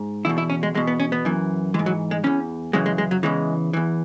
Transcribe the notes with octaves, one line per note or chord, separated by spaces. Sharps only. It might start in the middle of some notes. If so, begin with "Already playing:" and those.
Already playing: G#2
E2 B2 E4
E4
C#4
G#3
E2 B2 G#3
B3
C#4
B3
F#2 E3
G#2 E3 G#3
F#3
G#3
E2 E3 C#4
F#2 C#3 E3 G#3
G#3
G#3
F#3
E2 C#3 E3 G#3
E2 E3